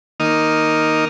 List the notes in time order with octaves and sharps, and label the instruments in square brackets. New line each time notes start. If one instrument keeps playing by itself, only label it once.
[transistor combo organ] D#3 A#3 D#4 D#6 F6